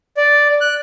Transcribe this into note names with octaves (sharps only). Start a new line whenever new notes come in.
D5
F#6